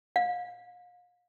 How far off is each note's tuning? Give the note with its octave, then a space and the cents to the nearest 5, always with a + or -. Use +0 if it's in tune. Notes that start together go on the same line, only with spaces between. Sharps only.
F5 +35